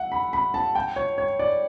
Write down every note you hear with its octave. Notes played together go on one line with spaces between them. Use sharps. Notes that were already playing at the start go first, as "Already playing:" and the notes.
Already playing: E5 F#5
B5
B5
A5
G5
C#5
C#5
D5